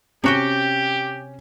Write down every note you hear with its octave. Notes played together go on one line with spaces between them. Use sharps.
C3 C#4 F#4 G4 G5